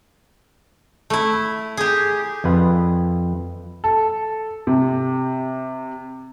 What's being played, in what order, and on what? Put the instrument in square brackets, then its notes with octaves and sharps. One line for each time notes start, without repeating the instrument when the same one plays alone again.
[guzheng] A3 E4
G4 G#4
[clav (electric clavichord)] F2 F4 B4
[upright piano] A4
C3